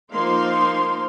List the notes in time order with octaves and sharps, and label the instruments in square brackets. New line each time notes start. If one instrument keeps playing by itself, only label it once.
[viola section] F3 A#3 D#4 C5 F5 C6